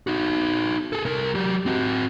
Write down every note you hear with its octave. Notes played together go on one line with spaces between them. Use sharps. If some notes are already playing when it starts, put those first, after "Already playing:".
D#4 F#4
G#4 A4
C2 A#4
F#3 G4
C4 F#4